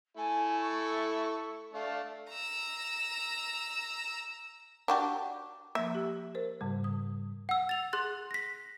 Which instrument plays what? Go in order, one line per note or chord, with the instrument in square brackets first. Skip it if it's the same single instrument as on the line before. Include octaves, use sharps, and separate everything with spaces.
[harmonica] A3 E4 A4 [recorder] G#5
[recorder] C#6
[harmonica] A3 D4 [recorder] F5
[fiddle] A#5 E6
[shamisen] D4 F#4 G4
[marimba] F3 A#3 [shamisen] E5
[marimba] G4
A#4 C5
G#2 C#3 G3
D#6
[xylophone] F#5 E6
A6 F7
G#4 C6 F#6 A6
A#6 B6